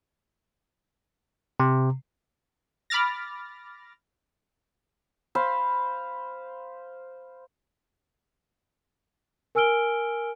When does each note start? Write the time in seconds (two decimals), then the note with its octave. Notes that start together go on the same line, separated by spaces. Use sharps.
1.60 C3
2.90 B5 D6 F6 A6 A#6
5.35 C5 F5 B5
9.55 A#4 G#5 E6 F6 D7 G7